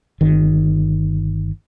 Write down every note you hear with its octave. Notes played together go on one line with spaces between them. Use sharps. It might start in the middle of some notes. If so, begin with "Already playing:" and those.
G1 D#3